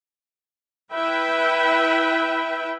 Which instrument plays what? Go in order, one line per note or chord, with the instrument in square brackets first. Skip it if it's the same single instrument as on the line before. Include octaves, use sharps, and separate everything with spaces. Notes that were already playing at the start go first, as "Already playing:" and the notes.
[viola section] E4 B4 E5 G5